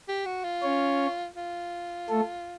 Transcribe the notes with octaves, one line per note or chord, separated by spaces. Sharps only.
G4
F#4
F4
C#4 C#5
F4
A3 A4